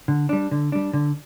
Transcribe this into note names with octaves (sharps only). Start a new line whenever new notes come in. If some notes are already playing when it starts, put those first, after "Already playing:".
D3
G3 D4
D3
G3 D4
D3